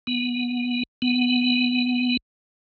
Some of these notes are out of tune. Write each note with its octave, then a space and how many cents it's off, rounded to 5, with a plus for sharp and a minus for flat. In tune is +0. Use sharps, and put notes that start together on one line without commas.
B3 -15
B3 +5